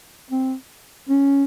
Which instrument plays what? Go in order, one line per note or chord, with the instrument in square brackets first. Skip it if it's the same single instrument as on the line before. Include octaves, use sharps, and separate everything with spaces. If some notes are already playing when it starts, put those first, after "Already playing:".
[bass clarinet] C4
C#4